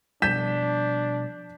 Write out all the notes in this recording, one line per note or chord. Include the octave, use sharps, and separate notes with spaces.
B2 F3 G3 D4 G6 B6 E7